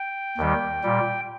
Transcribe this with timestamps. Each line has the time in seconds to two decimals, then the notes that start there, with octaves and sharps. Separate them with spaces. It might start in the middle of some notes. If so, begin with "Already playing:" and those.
Already playing: G5
0.38 D#2 D#3 G3
0.83 A#2 G3